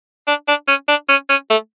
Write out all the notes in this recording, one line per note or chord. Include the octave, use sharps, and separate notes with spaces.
D4
D4
C#4
D4
C#4
C#4
A3